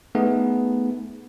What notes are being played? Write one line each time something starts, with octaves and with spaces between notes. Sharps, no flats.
A3 B3 D#4 G#4